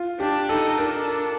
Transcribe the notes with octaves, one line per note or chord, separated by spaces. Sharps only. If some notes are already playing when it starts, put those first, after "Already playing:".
Already playing: F4
D4 G4
D#4 A4
D4 A#4